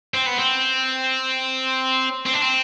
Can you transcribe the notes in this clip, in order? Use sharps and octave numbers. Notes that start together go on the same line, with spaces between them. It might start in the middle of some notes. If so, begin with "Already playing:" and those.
C4
B3
C4
C4
D4
C4